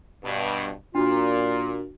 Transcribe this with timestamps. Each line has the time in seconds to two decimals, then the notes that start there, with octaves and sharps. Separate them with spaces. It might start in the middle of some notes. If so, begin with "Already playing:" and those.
0.23 G2 B2
0.95 A#2 D4 F4 F#4